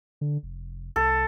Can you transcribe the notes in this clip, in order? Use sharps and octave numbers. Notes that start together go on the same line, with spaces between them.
D3
F1
C2 A4